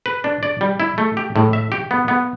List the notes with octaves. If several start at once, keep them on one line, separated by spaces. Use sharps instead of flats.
B4
D4
D5
G3
E4
A3
G4
A2
E5
G4
B3
B3